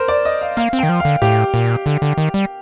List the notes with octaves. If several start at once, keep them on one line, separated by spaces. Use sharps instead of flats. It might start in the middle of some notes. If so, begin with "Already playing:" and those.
Already playing: A#4 C5
D5
D#5
F5
A#3 F5
C4
D#3 G5
F3
D3 F5
A2 G4
A#2
D3
D3
D#3
G3